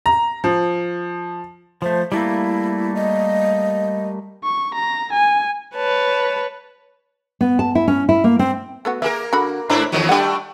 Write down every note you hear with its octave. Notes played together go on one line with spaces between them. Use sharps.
A#5
F3
F3 A3 C5
G3 A3 A#3 E4
D#5
C#6
A#5
G#5
B4 C#5 A5
B3
A5
E4
C#4
E4
A#3
C4
A3 B3 F#4
A#3 G#4 A#4 E5
D3 F#4 B5
G#2 A3 D4 E4 C5 A#5
E2 D#3 F#3
G3 A3 D4 F#5 G5